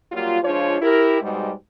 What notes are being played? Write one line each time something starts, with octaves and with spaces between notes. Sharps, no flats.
F#3 G3 A#3 F4
F3 G#3 D4 F4 C#5
E4 G4 A#4
G#2 B2 G3 G#3